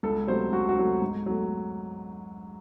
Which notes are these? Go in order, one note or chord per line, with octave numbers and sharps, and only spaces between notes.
C#2 A4
C3 F#3 A3 C5
C#2 F#4
F#4
C3 F#3 A3
G#2
F#3 A3